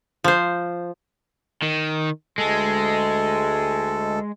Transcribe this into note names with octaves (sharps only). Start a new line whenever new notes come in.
F3 C5
D#3
D2 G#3 A4